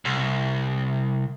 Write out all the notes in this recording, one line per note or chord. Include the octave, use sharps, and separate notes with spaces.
C2